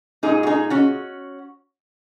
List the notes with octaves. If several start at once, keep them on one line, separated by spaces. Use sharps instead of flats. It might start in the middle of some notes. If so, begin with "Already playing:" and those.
A#2 G#3 D#4 G#4
F#4
D#4 G#4
C#4 F#4